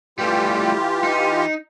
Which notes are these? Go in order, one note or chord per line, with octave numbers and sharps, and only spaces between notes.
E3 G3 A3 F4 G4
D#4